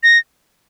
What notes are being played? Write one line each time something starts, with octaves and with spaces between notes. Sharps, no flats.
A#6